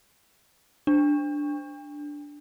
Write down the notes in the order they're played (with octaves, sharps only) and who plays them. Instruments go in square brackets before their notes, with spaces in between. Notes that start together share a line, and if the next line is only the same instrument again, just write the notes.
[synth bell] D4